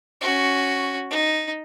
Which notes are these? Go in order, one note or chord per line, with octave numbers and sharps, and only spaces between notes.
C#4 F#4
D#4